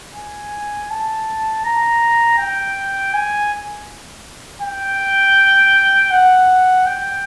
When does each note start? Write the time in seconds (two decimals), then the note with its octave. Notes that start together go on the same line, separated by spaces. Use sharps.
0.15 G#5
0.90 A5
1.64 A#5
2.38 G5
3.14 G#5
4.62 G5
6.11 F#5
6.86 G5